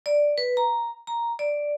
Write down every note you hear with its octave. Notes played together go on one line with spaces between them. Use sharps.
D5
B4
A#5
A#5
D5